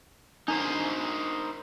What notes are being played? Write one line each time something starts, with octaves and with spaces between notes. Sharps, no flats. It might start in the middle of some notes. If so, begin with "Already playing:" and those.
D4 D#4 A#4 C5